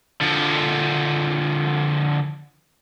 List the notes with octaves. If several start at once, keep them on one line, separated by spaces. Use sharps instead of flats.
D3 F3